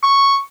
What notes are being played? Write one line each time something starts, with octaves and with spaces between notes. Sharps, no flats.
C#6